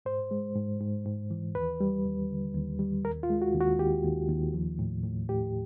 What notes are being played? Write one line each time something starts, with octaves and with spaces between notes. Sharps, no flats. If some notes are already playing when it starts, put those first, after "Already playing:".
G#2 C5
G#3
G#2
G#2
G#2
E3
D#2 B4
G3
D#2
D3
D#2
G3
D#2 A#4
F4
G#3
F#4
D#2
F#4
D#2 G4
D#2
D#2
F3
A2
A2
A2 G4